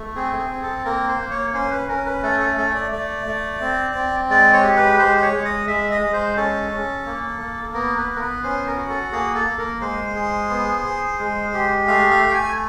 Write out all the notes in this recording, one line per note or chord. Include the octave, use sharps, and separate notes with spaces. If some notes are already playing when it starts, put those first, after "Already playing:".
Already playing: A3
C4 G#4
G#4
C4
A4
A#3 A#4
C5
A#3
C#5
C#4 C5
B4
C#4 A#4
B4
A3 A4
A4
A3 A4
D5
A3 D5
A3
C4
C4
G#3 D5
C#5
G4
B4
G#3 C5
C5
C#5
G#3
D#5
G#3 E5
D#5
G#3
C5
C#4 A4
C#4
A#3
A#3
B3 A#4
B4
B3
A#4
B4
C#4 C5
A#4
F#4
A4
A#3 G#4
A4
A#3
A#4
G#3 C5
G#4
B3
G#4
G#3
G4
A3 F5
F5
A3
G5
G#5